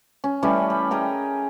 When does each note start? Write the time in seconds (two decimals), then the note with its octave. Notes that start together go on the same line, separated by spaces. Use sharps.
0.24 C#4
0.42 E3 G3 A3 C#4
0.70 B5
0.91 G#4 A#4 D#5 G5